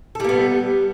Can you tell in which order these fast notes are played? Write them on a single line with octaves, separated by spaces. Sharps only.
A4 G3 A#3 B3